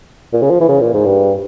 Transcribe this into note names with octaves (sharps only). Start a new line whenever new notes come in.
A#2
C#3
F3
E3
C#3
A#2
G#2
G2